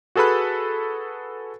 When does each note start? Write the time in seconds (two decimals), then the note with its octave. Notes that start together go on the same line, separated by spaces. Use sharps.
0.15 F#4 G#4 A4 B4 B5 F#6